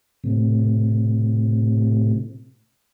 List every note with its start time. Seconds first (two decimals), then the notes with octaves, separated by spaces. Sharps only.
0.24 A2 C3